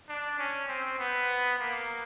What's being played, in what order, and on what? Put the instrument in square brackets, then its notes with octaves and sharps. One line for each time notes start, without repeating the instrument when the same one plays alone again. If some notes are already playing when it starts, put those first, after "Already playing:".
[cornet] D4
C#4
C4
B3
A#3